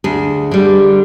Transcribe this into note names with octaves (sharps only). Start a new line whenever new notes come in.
D2 G#4
D3 G3